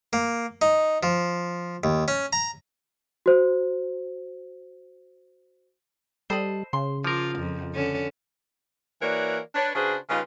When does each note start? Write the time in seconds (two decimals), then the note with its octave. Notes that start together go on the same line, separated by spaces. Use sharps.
0.13 A#3
0.62 D#4
1.03 F3
1.84 D#2
2.08 C#4
2.33 A#5
3.26 F#4 C5
6.30 G3 A4 C5 D#5 B5
6.73 C#3 C6
7.04 F3 F4 A#4 D6
7.39 F2
7.74 D3 C#4 A4
9.02 E3 A#3 F#4 A#4 C#5 D5
9.55 D4 B4 C#5
9.75 C#3 D4 F#4 G#4 B4 C5
10.09 C#3 G3 D#4 F4 B4